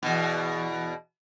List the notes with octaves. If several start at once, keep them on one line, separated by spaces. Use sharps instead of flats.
E2 B2